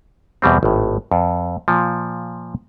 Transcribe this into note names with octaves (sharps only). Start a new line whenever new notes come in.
E2 B2 G3 C4
G#1 A2
F2
A#2 F3